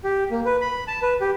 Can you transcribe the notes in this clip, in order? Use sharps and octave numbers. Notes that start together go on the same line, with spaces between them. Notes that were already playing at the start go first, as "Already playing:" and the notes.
G4
A#3
B4
B5
A5
B4
G4